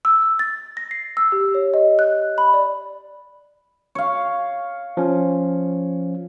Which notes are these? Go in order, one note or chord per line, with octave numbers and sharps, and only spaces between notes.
E6
E6
A6
A#6
C7
E6
G4
C#5
D#5
F#6
B5
D5
C#5 F5
F3 C#4